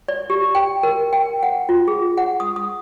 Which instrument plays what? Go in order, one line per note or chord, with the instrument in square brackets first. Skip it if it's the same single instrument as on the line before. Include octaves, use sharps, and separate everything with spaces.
[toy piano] D5
G4
G5
A#4
G5
F#5
F4
G#4
F#5
D#6
D#6